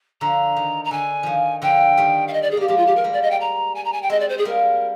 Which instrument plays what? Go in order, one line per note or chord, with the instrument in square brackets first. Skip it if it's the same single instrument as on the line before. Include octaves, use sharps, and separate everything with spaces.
[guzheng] D3 F3 [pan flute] A#5
[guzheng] D#3
[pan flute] A#5
[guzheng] D3 [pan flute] G#5
[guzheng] D#3 F3
[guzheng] D3 F3 [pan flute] G5
[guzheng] D#3 G3
[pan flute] F5
D#5
D5
G#4
[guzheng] A#3 [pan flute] G4
[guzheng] F3 G#3 [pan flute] G4
[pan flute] F4
G4
A#4
[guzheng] G3 A#3
[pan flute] D5
D#5
G5
A#5
G#5
A#5
G#5
G5
[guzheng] G#3 C4 [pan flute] D#5
[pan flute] D5
C5
G#4
[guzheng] G3 A#3 [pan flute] A#4